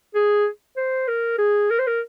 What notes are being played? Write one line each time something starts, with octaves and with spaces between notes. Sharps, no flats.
G#4
C5
A#4
G#4
A#4
C5
A#4